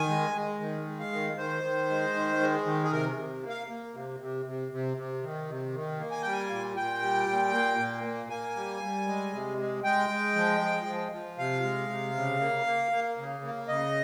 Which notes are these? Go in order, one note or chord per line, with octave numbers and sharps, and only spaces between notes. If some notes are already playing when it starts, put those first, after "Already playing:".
Already playing: D#3 G#5
G#3
G#3
D#3
G#3
F5
D#3
D#3 C5
D#3
G#3
D#3
G#3
D#3
G#4
C3 A#4
C3
A#3
F5
A#3
C3
C3
C3
C3
C3
D#3
C3
D#3
A#3
G#5
G3 G5
G#5
A#2
A#2 G5
G3
A#2
A#3
A#2
A#3
A#3 G#5
G3
G3
G#3
C3
G#3
G#3 G5
G#3
F3
G#3
F3
F3
C3 F5
G#3
C3
C#3
A#3
A#3
A#3
C#3
A#3
C#3 D#5